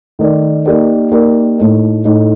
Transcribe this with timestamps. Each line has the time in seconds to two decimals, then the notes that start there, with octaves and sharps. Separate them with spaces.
0.19 D#3 A3 D#4 A#4 D5
0.66 A#3 D#4 G4 A#4 D5
1.11 A#3 D#4 G4 A#4 D5
1.58 A2 A3 D#4
2.05 A2 A3 D#4